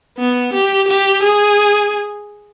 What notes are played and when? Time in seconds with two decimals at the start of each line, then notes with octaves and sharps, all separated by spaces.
0.18 B3
0.53 G4
0.88 G4
1.23 G#4